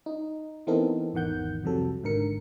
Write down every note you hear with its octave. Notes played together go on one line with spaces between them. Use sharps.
D#4
E3 B3 C4 D#4 A4 A#4
G#1 E2 D#3 F#5 G6
C2 F2 C3 F#3 A4
G#1 G#2 D3 A#4 C#7